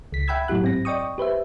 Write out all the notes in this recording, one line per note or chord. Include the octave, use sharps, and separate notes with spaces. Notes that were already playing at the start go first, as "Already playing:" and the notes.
C#2 B6
E5 F#5 G5 B5 E6 G#6
A2 F#3 E4 G4 F#6
G#2 C4 A#6
D5 D#5 G5 C#6 D#6
G4 B4 C5 E5